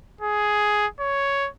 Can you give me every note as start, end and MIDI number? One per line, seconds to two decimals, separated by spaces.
0.21 0.87 68
1.00 1.50 73